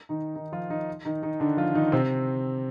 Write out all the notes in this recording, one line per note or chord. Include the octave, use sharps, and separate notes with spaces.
D#3 D#4
D#3 D#4
F3 F4
D#3 D#4
D#3 D#4
D#3 D#4
D3 D4
F3 F4
D#3 D#4
C3 C4